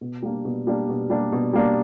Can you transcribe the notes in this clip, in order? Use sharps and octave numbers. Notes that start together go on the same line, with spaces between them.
B2
G3 A#3 D4
B2
G3 A#3 D4
B2
G3 A#3 D4
B2
G3 A#3 D4